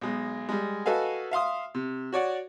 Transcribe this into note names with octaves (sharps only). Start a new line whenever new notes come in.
B1 G#3
G3 G#3
F#4 A4 B4 D#5 F5 G#5
E5 F5 C6 D#6
C3
F#4 C#5 D5 F#5